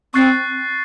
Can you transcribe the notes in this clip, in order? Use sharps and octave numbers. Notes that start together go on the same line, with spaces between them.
C4 C#6 F#6 A6 C7